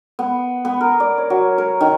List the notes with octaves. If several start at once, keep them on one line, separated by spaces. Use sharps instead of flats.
B3
B3
A#4
D5
C#5
F#3
A#4
D#3